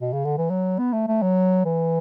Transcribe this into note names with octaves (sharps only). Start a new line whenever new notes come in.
B2
C#3
D3
E3
F#3
B3
A3
A3
F#3
E3